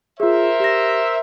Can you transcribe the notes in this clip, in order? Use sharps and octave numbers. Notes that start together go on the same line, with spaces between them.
F4 G#4 A#4 C5 E5
G4 A#6